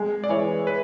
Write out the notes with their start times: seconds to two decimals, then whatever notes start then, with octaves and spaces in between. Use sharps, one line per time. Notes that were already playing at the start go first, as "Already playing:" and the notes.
Already playing: G#3
0.24 D5
0.29 E3 C#5
0.67 B4